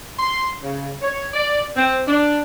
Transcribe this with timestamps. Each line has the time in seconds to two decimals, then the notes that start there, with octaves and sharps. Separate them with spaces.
0.18 C6
0.63 C#3
1.02 C#5
1.33 D5
1.76 C4
2.07 D4